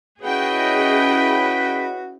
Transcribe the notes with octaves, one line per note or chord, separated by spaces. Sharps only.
C#4 E4 F#4 G#4 B4 D#5 G5